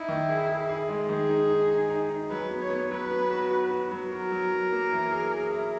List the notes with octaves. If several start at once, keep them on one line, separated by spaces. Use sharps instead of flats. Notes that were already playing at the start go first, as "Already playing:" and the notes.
Already playing: D#4 E4
D#3
G#4
G#4
G#4
G#3
D#3 G#4
D#4
D#4
D#4
D#4
D#4
F#3 B4
B3
C#5
B3
F#3 B4
B3
F#4
F#4
F#4
F#3
F#4 A#4
F#3
F#3
A#3
E3
G#4
G#4
E4